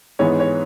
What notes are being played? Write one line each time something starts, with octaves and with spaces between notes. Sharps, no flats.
G#2 E3 G#3 B3 C#5
C#5